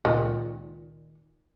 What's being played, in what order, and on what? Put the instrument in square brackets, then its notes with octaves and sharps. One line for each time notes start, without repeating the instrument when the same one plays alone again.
[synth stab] C#2 A#2 [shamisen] D#3